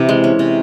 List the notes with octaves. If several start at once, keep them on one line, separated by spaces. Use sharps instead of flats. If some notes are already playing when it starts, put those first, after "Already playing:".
Already playing: C3 E3
G#3
C#4
C3